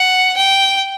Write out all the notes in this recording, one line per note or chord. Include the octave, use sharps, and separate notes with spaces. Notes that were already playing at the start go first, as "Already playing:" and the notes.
Already playing: F#5
G5